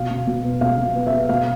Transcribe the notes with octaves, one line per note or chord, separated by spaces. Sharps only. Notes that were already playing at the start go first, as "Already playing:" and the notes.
Already playing: B2 F5
B2
B2
B3
B2 F5
B2
B3
E5
B3
B2 F5